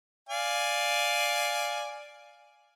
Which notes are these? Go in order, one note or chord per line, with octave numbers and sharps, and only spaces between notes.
D5 F5 G#5